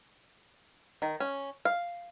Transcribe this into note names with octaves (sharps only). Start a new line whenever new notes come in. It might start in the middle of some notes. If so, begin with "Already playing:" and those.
D#3
C#4
F5